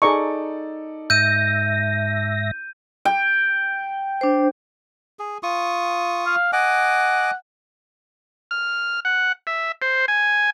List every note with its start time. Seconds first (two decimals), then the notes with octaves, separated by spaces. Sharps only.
0.02 D#4 G#4 A4 D5 A#5 C#6
1.10 G#2 E5 G6 A#6 D#7
3.05 G5
4.21 D4 C5
5.19 G#4
5.43 F4 C#6 D#6
6.26 F5
6.53 D#5 F#5 G#5 D6
8.51 F6
9.05 F#5
9.47 E5
9.82 C5
10.08 G#5